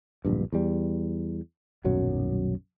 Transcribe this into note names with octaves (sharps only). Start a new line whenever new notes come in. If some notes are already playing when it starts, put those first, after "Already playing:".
D1 A#1 G2
E2 G3
D#1 B1 F#2 F#3